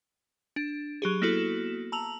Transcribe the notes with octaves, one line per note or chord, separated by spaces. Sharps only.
D4
F#3 G4 G#4
A#3 B3 E4 F#4 A4
A5 A#5 E6 F7 F#7